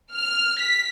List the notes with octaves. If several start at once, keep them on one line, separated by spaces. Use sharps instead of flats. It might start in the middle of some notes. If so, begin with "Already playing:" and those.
F6
B6